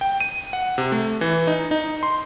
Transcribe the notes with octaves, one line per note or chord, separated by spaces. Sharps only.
G5
D#7
F#5
C3
A3
E3
D#4
D#4
C6